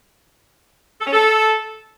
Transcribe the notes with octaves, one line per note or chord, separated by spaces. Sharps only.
A4
C#4
A4